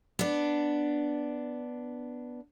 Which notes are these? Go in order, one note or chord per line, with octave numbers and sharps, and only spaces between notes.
B3 D4